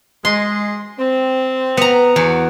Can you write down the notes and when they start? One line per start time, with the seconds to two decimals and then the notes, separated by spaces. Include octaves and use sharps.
0.25 G#3 C6
0.99 C4
1.77 B3 A#5
2.16 E2 F#4